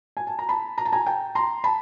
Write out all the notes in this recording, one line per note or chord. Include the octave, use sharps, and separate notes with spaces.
G#5
A5
A#5
A5 B5
A#5
A5
G#5 A#5
G5 A5
A#5 C6
A5 B5